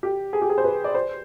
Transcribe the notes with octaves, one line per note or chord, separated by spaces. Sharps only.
G4
G#4
G4
G#4
C5
B4
D5
C5